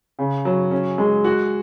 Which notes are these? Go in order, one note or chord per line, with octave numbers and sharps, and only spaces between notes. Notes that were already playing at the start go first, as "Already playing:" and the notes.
C#3
F#3
C#4
G#3
F#4